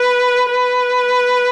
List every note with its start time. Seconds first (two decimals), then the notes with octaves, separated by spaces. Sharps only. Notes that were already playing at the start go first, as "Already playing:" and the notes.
Already playing: B4
0.51 B4